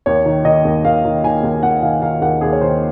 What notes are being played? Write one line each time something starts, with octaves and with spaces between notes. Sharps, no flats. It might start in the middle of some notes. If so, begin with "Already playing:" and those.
D#2 C#5
D#3
D#3 D#5
D#2
D#2 F5
D#3
D#3 G#5
D#2
D#2 F#5
D#3 F5
D#3 F5
D#2 F#5
D#2 G#4
C#5
D#3 C5